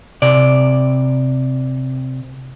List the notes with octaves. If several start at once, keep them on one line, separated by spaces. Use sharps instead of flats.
C3 D5